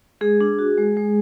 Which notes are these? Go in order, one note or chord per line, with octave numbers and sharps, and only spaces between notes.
G#3 G#4
D4
F#4
G#3
G#3